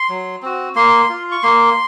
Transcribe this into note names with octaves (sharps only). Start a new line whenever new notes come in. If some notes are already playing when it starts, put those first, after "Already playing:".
Already playing: C6
F#3
C4 F#4
A#3 C6
F4
C#6
A#3 C6